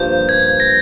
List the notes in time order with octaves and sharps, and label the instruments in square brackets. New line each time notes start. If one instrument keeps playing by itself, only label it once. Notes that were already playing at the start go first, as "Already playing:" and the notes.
Already playing: [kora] G2 F3 A#3 [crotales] G6
[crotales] G#6
A#6